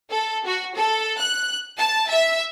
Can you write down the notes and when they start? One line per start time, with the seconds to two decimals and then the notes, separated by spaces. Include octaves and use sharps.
0.10 A4
0.46 F#4
0.76 A4
1.20 F#6
1.77 A5
2.09 E5